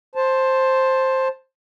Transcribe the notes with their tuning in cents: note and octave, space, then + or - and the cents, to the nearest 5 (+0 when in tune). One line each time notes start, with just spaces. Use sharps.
C5 +10 A5 +0